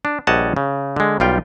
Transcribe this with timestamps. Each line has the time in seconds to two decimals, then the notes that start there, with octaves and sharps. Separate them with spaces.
0.05 D4
0.27 A#1 G3 C#5 D#5 F#5 A5
0.56 C#3
0.96 D3 G#3
1.20 B1 G3 F4 G5